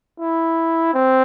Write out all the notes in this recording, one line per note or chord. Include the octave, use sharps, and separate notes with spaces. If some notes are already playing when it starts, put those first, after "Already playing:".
E4
C4